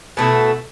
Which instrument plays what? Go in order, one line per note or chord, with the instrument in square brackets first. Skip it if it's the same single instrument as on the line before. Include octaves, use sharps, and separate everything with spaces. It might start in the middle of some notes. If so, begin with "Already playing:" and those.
[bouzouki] B2 A3 E4